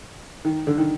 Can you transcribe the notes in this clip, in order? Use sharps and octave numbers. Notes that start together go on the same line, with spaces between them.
D#3
D3
D#3